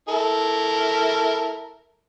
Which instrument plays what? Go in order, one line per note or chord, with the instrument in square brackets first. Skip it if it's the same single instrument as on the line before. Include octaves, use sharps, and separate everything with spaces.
[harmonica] E4 A4 A#4